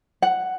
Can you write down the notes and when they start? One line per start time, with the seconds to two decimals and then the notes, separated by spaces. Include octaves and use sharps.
0.22 F#5